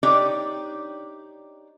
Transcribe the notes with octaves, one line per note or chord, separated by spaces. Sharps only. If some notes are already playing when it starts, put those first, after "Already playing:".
D4 D#4 G4 C#5 D5